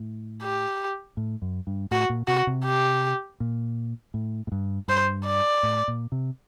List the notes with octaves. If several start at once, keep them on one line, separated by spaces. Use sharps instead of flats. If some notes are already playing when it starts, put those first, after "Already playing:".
Already playing: A2
G4
A2
F#2
G2
A2 F#4
A#2
C3 F#4
C3
G4
A#2
A2
A2
G2
G2 C5
D5
A2
A#2
C3